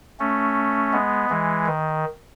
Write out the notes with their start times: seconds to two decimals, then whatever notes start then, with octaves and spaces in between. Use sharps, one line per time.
0.20 A3 C#4
0.93 G#3 B3
1.30 E3 G#3
1.66 D#3